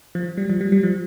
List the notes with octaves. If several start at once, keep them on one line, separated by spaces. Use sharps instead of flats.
F3
G3
F3
G3
G3
F3